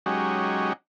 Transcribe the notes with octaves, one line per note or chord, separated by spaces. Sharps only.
F#3 G#3 C#4 D#4 F#4 G4